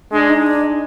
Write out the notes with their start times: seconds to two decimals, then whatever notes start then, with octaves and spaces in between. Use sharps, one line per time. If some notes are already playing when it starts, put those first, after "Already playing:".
0.13 G#3 D4
0.30 D#4
0.46 D4